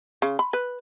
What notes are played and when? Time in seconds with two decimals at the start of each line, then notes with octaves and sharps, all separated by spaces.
0.22 C#3
0.39 B5
0.53 B4